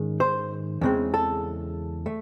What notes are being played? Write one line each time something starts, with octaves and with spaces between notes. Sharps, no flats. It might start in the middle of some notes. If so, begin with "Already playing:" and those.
Already playing: G#2 D#3 G#3 C#4
C5
E2 C#3 G#3 C4
A4
A3